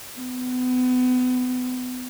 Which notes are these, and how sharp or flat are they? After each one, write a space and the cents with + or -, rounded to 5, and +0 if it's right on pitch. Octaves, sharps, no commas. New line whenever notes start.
B3 +35